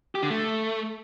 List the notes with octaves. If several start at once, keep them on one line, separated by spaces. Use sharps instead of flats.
G4
D3
A3